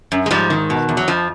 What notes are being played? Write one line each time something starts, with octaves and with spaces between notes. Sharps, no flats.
F#2
G#3
G#2 F3 G3
D#3
B2
E2
F#3
F2 F3